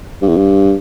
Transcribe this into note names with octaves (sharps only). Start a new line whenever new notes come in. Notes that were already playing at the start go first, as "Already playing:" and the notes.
G2
E2
G2